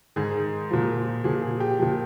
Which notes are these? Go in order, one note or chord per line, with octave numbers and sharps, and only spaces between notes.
G#2 D#3 G#4
A#2 F3
A#2 F3 G#4
G#4
G4
A#2 F3